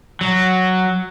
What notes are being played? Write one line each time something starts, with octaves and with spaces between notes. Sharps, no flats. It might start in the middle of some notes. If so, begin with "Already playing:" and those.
F#3